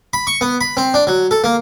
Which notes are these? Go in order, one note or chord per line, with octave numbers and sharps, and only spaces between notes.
B5
C#6
B3
B5
C4
D4
F#3
A4
A#3